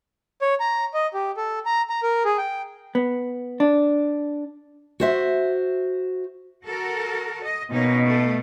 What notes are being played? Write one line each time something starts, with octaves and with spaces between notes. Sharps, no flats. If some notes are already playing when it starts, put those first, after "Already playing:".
C#5
A#5
D#5
G4
A4
A#5
A#5
A#4
G#4
G5
B3
D4
F#4 C5 E5
F#4 A4 A#4
D#5
B2 A#3 C#4 D#4
A3